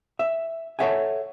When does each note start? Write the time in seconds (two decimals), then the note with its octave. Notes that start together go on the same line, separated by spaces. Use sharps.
0.19 E5
0.79 A4 C#5 E5 F#5 G#5